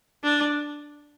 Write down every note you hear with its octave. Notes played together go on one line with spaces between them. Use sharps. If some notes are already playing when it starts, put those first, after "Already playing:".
D4